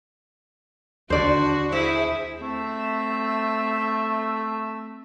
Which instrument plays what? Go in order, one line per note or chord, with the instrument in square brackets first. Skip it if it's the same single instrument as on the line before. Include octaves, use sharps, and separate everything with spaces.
[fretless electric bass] D#2 D3 [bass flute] D4 [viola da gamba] F#4 [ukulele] C5 D5
[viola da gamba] E4 G#4 [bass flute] C5 [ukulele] E5
[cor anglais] A3 [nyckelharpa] C4 E5